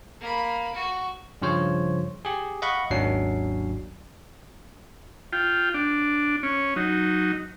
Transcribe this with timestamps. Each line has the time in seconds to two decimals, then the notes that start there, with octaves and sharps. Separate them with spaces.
0.21 A#3 B5
0.75 F#4
1.42 G2 C#3 F3 C5 C#5
2.25 G4 G#4
2.62 D#5 F5 F#5 B5 C#6
2.90 G#1 D#2 F#3 C#4 D4 C7
5.33 F4 G5
5.74 D4
6.43 C#4
6.76 F#3 D#4